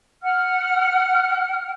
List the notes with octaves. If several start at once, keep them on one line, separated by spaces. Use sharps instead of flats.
F#5 F6